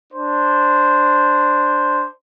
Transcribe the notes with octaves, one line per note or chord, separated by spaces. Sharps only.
D4 C5